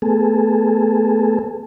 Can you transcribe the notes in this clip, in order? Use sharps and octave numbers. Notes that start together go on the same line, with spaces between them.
A3 B3 G#4 A4